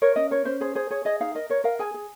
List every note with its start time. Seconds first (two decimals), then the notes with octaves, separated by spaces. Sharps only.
0.02 A#4 C#5
0.16 C#4 D#5
0.31 A#4 C#5
0.45 C#4 C5
0.61 G#4 C5
0.75 G#4 C5
0.90 G#4 C#5
1.05 G#4 D#5
1.20 D#4 F5
1.35 A#4 D#5
1.50 A#4 C#5
1.64 A#4 F5
1.79 G#4 G#5
1.94 G#4